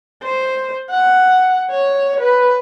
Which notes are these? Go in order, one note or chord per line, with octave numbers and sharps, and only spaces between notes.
C5
F#5
C#5
B4